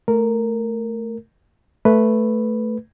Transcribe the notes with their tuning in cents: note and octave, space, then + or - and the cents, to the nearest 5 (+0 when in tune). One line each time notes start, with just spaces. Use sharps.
A3 +0 A#4 -10
A3 +0 B4 +0